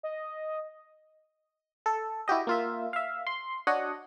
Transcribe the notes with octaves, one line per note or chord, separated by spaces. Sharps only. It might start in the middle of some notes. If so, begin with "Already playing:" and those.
D#5
A4
E4 F#4 G4 D#5
A#3 F4 E5
E5 F5
C6
D4 F#4 C#5 D#5 F#5